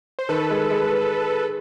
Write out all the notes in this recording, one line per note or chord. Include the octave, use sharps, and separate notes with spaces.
C5
D#3 A4 B4
G#3
G#3